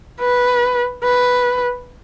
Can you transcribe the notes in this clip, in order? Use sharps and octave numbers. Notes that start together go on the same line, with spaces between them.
B4
B4